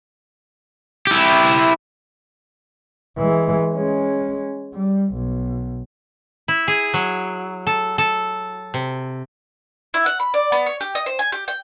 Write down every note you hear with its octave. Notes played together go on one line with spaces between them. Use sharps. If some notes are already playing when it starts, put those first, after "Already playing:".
E4 G4
E3 G#3
G#3 C#4
G3
B1
E4
G#4
F#3
A4
A4
C3
E4
F#5
B5
D5
B3
C#5
G4
D#5
C5
G#5
G4
G5